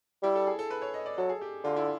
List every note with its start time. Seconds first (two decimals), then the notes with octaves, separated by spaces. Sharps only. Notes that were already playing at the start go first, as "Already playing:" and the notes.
0.23 G3 E4
0.35 A4
0.47 G#4
0.59 A4
0.70 B4
0.82 C#5
0.94 D#5
1.06 D5
1.18 F#3 A4
1.29 G#4
1.41 G4
1.64 D3 F4
1.76 E4